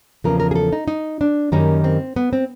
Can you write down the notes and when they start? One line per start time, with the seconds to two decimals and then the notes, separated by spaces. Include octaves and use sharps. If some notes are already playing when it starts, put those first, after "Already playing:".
0.24 E2 C#3 F3 A#3 A#4
0.40 A#4
0.51 G#4
0.55 A4
0.72 D#4
0.88 D#4
1.21 D4
1.52 F#2 D#3 G3 A#3 C#4
1.84 C4
2.16 B3
2.33 C4